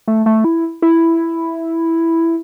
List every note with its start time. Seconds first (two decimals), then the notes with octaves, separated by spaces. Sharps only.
0.08 A3
0.26 A3
0.44 E4
0.82 E4